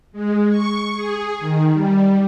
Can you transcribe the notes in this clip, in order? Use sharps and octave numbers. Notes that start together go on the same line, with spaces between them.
G#3
C#6
G#4
D#3
G3